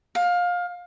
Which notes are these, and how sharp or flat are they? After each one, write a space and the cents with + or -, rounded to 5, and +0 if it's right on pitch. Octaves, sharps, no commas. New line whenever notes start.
F5 +20